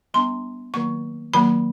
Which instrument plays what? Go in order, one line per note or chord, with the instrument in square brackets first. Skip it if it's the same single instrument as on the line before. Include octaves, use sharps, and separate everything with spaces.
[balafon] G3 B3 D4 C6
D#3 F#3 A#3 C#6
D#3 F#3 A#3 B5